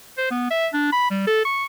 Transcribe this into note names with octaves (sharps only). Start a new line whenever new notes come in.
C5
B3
E5
D4
B5
G3
A4
C#6